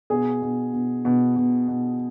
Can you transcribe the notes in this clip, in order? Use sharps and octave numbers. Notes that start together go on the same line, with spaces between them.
B2 G#4
B2
B2
B2
B2
B2